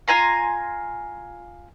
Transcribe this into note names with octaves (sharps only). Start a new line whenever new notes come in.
F4 G#5 A#5 C6